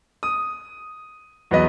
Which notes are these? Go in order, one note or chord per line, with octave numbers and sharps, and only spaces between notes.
D#6
E2 F#3 B3 B4 D#5